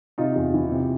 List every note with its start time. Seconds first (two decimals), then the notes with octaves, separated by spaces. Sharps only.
0.18 C3 D#4 F4
0.36 E2
0.54 E3
0.71 C3